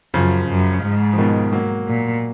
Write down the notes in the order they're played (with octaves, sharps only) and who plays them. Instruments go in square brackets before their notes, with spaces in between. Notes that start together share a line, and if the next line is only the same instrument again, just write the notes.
[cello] F#2 [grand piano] C#3 F3
[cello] F#2
G#2
[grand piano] F3
B2 D#3
F#3 A#3
[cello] A#2